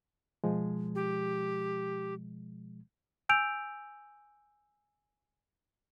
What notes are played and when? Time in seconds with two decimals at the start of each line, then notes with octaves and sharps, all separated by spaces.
0.44 B2 F3 G#3
0.95 G4
3.29 G#5 E6 G6 D7 F7